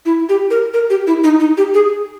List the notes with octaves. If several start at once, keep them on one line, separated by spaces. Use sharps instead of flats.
E4
G4
A#4
A#4
G4
E4
D#4
D#4
G4
G#4